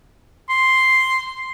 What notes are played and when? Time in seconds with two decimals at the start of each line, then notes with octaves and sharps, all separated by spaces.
0.50 C6